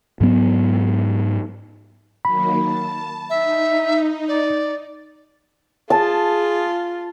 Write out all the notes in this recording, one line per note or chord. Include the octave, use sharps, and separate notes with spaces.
G#2 F#3 B3
D#3 F#3 A#3 B5
A5
D#4 E5
D5
F4 G#4 A5